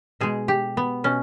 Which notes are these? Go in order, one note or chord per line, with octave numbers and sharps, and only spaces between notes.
B2 G#3 G#4
G4
B3
B2 C#4